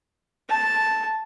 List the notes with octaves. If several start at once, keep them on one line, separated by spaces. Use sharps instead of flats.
A5